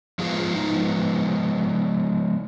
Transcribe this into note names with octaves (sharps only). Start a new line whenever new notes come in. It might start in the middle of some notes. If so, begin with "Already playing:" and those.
F3 G#3 B3 F4 G#4
F4
D#4